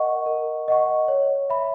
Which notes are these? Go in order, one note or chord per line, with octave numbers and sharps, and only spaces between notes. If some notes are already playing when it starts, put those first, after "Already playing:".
Already playing: A#4 D#5 F#5 C#6
A#4
D#5 F#5 C#6
C#5
E5 B5